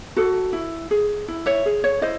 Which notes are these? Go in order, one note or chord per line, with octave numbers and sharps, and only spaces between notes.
F#4 A4
E4
G#4
E4
C#5 E5
G#4
C#5
E4 C5 D#5